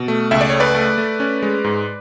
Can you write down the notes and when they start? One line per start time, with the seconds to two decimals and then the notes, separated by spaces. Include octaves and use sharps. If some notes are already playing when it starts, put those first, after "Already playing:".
Already playing: B2
0.08 A3
0.31 C#2 E5
0.41 D5
0.50 A3 C#5
0.60 B4 D5
0.75 A3
0.98 A3
1.20 C#4
1.42 G#3
1.64 G#2